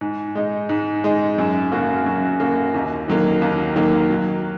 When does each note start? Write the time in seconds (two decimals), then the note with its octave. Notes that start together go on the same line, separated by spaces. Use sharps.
0.01 G#2
0.35 G#3 D#4
0.69 G#2
1.04 G#3 D#4
1.38 F#2
1.72 C#3 A#3 F#4
2.06 F#2
2.40 C#3 A#3 F#4
2.74 D#2
3.08 D#3 F#3 A#3
3.42 D#2
3.76 D#3 F#3 A#3
4.10 F#3